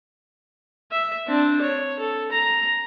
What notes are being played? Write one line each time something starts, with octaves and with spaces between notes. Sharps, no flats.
E5
C4 D4
C#5
A4
A#5